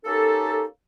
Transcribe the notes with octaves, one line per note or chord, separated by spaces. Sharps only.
A#3 C#4 D#4 G4 A4